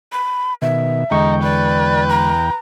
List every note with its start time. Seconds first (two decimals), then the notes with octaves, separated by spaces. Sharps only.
0.12 B5
0.62 B2 D#3 E5
1.11 E2 D3 G#3 D#4 G5 C#6
1.43 B4 D5
2.09 A#5